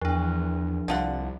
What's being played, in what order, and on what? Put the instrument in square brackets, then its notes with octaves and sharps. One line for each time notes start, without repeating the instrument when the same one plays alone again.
[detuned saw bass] E2 [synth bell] F3 D4
[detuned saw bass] C2 [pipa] D3 F4 F#5